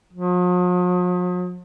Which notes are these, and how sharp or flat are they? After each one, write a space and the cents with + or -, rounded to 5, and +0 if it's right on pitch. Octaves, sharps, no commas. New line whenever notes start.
F3 +45